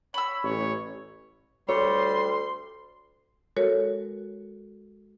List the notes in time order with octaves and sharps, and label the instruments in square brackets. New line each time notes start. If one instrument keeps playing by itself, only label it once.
[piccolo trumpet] C#5 [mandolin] B5 E6
[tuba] A1 [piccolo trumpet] C#5
[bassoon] D2 [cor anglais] G3 [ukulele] C#5 [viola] C6
[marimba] G#3 F#4 A4 A#4 C#5